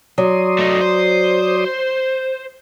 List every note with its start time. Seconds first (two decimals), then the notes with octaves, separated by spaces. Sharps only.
0.18 F#3 D5 C6 D#6
0.59 A3 D#4
0.81 C5